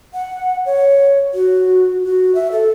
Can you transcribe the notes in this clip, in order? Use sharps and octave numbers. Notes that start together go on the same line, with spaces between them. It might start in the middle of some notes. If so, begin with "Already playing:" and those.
F#5
C#5
F#4
F#4
E5
A4